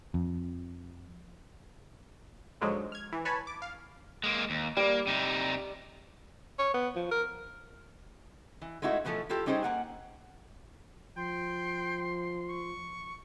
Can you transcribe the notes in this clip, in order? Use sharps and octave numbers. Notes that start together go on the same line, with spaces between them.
F2
G#2 D3 F3 F#3 G#3
F6 G#6
E3
B4 C#5 G#5 A5 B5
D6
F5
G#3 A#3
D#2
G3 A#3 D5
C3 D#4
C#5
B3
F3
A#4
E3
G#3 A3 D#4 E4 F#4
B2 E3 F3 A3 A4
E4 F4 G4 A4
G3 C#4 D#4 G#4 C5 G5
A#3 F#5 G#5
F3 G5 C6
C#6